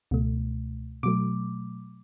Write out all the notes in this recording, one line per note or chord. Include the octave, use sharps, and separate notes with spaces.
C#2 B2 A3
B2 F#3 A3 D6